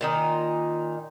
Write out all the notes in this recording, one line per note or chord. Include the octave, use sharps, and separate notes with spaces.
A#2 D#3 D#4